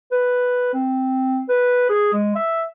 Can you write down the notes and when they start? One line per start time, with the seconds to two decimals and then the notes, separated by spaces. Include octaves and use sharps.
0.11 B4
0.73 C4
1.49 B4
1.89 G#4
2.13 G#3
2.35 E5